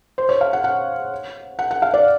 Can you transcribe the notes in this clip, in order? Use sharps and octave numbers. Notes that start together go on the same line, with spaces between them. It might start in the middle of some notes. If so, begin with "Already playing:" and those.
C5
C#5
F5
F#5
F#5
F#5
F#5
F5
D5